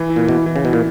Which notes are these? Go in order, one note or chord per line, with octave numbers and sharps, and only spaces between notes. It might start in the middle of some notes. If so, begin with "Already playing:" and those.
Already playing: E3
E4
A#2
B2 E3
E3
C#3
B2 E4
A#2